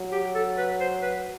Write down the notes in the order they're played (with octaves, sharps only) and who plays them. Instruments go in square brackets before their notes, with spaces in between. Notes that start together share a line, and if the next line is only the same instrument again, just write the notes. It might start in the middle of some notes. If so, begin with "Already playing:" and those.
Already playing: [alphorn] F#3
[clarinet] G4
A4
B4
C5
B4